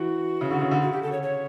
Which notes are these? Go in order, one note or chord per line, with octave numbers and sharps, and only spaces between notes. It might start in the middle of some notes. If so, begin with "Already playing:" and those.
Already playing: E3 F#4
C#3
D3
C#3
D3
C#3 F#4
G4
A4
C#5
C#5